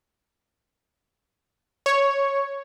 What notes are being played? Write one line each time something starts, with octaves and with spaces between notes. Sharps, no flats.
C#5